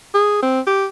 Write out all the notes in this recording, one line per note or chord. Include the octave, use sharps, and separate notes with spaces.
G#4
C4
G4